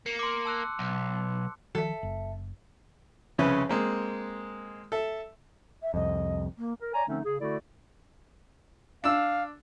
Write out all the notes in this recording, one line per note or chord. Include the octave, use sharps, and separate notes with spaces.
A#3 C#7
C6 D6
A5 E6 F#6
B1
D#3 F3 A4 E5
F#1
C2 F2 C#3 C#4 B4 E5
G#3 A#3 C4
A4 E5
E5
C2 F2 D#5
A#3
A#4
C#5 D5 G#5 A#5
D3 F3 A3 C4 C#4 D#4
C#3 G#4
D3 A3 E4 F#4 A4 D5
D4 F5 E6